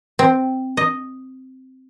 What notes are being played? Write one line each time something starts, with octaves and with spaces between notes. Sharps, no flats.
C4
D#5